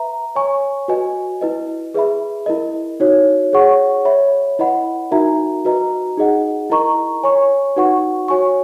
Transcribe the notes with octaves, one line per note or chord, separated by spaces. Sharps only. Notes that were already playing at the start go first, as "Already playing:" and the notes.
Already playing: B4 E5 A#5
C#5 G#5 C#6
F#4 B4 D#5 G#5
E4 B4 D#5
G#4 B4 E5 B5
E4 A#4 D#5
D#4 F#4 C#5
G#4 C#5 F#5 C#6
C#5 E5 B5
E4 B4 D#5 F#5 B5
D#4 F#4 A#4 E5 A#5
F#4 B4 D#5 A#5
D#4 G#4 D#5 F#5
E4 A#4 D#5 A#5 C#6
C#5 G#5 C#6
D#4 F#4 B4 F#5 C#6
F#4 C#5 G#5 C#6